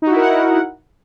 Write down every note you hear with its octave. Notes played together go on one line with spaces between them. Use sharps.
D#4 E4 F#4 A#4 F#5